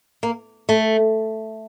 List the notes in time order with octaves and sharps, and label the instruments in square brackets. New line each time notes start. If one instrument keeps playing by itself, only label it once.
[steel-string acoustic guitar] A#3
A3